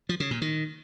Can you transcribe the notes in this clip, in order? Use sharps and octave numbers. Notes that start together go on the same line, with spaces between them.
F3
C#3
A#2
D#3